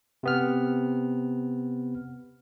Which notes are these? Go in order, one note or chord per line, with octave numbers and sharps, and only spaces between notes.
C3 B3 F6